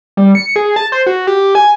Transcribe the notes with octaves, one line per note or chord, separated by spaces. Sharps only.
G3
C#7
G#4
A5
C5
F#4
G4
G#5